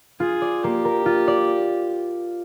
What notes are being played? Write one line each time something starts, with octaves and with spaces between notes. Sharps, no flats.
F4 G#4
D5
A#3 G4
A#4
F4
D5